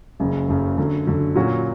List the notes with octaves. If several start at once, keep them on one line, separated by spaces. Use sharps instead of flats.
F#1 F#2 C#3
F#1 F#2 C#3
F#2 D3 F#3
F#2 D3 F#3
A#2 F#3 C#4 F#4